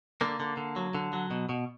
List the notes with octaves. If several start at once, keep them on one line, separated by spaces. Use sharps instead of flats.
D3 A#3
D3
D3
F#3
D3
F#3
B2
B2